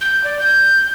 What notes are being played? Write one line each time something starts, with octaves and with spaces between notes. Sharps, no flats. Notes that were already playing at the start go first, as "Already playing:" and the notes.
G6
D5
G6